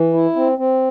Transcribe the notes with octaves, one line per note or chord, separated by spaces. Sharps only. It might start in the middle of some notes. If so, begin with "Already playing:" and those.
Already playing: E3
E4
C4
C4